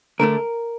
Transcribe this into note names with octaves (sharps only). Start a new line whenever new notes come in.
D2 D3 A3 D4 A#4